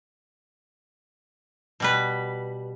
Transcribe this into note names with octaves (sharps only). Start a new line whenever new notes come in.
B2 G3 B4